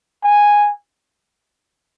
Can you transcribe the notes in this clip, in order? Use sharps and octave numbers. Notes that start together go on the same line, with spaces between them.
G#5